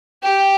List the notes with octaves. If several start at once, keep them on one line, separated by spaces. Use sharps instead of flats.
G4 G5